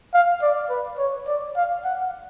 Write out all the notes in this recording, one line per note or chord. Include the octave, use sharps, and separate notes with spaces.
F5
D5
B4
C#5
D5
F5
F#5